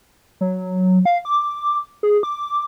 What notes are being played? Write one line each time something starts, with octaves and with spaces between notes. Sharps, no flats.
F#3
F5
D6
G#4
D6